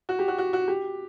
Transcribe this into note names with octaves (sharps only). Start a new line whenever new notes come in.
F#4
G4
F#4
F#4
F#4
G4